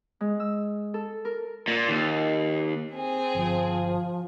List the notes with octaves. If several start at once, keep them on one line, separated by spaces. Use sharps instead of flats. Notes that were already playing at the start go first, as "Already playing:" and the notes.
G#3
E6
A4
A#4
A#2
D#2
C4 G#4
G1 F3